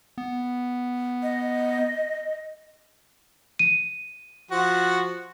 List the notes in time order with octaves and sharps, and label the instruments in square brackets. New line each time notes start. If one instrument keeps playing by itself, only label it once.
[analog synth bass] B3
[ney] D#5
[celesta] D#7
[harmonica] F3 F#4